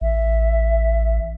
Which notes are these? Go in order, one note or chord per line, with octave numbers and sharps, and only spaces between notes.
A1 E5